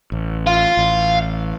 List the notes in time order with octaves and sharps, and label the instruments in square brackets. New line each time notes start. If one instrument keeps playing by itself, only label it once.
[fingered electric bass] A1
[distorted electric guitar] F5 C6
[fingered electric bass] A1